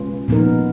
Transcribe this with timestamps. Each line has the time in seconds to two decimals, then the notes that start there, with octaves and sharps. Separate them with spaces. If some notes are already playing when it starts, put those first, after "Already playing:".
Already playing: B2 G#3 C#4 F4 B4
0.28 A#2 F3 B3 D#4 A#4